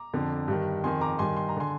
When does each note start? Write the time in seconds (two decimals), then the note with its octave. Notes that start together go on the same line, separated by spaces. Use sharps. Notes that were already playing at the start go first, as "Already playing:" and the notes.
Already playing: A#5 D6
0.13 F2 D3
0.48 G2 D#3
0.84 F2 D#3 G#5 C6
1.01 A#5 D6
1.19 G2 D#3 G#5 C6
1.37 C6
1.49 A#5
1.57 D3 G#5 C6